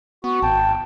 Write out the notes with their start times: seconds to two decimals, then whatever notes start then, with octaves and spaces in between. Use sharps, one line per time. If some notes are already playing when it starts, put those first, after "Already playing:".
0.24 B3 F#4
0.43 G#1 G5 A5